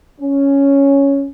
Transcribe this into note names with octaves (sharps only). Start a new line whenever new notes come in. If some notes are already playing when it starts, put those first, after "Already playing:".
C#4